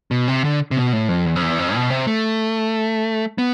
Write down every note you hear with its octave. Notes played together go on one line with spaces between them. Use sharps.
B2
C3
D3
C3
B2
A2
F2
E2
F2
E2
F2
B2
C3
A3
B3